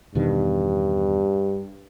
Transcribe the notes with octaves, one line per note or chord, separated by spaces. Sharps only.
E2 G2 B2 D#3